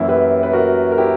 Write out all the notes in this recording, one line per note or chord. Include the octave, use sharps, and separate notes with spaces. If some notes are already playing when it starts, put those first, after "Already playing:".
Already playing: F#2 E3 A#3 C#4 E4
G4 B4
B4
F#4 A#4
A#4
E4 G4